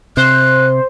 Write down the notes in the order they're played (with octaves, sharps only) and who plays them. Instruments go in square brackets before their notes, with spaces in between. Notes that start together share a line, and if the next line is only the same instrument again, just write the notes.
[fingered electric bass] C3 [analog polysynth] C5 [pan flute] F#6